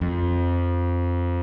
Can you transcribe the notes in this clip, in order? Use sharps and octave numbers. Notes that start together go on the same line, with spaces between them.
F2